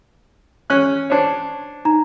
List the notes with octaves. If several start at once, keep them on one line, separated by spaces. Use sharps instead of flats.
C#4 F#6
D4 C5 C#5
D#4 A#5